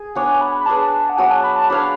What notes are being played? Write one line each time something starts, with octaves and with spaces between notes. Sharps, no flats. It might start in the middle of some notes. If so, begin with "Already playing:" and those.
Already playing: G#4
B3 D4 F#4 C#5 G#5
B5
B5
D4 G#4 B4 A5
F#5
F#3 B3 F#4 G#5
A5
B5
A5
D4 F#4 C#5 F5 B5